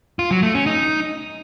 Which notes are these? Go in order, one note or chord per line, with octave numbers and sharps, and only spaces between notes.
F4
F#3
A3
C#4
D#4